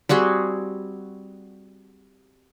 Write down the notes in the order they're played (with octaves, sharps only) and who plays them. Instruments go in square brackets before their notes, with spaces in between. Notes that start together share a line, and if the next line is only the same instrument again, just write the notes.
[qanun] G3 C4 F#4 G#4